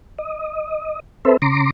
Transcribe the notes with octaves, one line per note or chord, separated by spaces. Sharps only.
D#5
C4 A4 B4 C5 E5
C#3 A#5 C6 D6